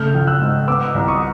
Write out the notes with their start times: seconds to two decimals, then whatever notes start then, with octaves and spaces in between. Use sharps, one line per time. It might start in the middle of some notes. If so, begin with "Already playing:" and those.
Already playing: C#3 A3 F6 G6
0.14 A#1
0.27 E6 F#6
0.41 G#2
0.67 B3 D6 E6
0.94 C2
1.08 C#6 D#6